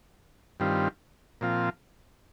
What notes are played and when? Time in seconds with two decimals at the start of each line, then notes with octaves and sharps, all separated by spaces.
0.60 G2 D#3 G3 C4 F4
1.41 A#2 F3 C4 F4